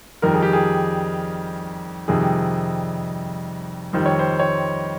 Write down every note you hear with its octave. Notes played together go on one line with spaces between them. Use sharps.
F2 D#3 G3 A#4
G#4
G4
G#4
F2 C3 D#3 G3 G#4
F2 D#3 G3 C5
C#5
C5
C#5